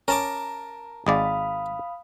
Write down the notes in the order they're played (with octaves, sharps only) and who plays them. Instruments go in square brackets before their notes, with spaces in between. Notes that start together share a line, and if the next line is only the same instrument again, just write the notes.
[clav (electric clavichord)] C#4 [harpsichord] A#4 A5 D6
[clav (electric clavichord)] G#1 G#3 D5 [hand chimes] F5 B5 D#6